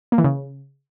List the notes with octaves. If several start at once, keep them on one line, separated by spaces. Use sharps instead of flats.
A#3
E3
C#3